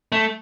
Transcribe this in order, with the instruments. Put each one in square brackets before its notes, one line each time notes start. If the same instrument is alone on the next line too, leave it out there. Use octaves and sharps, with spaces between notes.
[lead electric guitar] A3